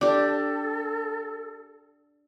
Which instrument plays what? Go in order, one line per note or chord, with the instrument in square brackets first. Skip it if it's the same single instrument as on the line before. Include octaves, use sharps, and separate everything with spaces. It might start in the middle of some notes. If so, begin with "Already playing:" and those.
[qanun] D4 G4 [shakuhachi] A4 [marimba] D5 D6